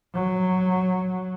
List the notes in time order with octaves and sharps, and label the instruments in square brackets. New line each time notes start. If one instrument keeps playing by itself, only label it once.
[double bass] F#3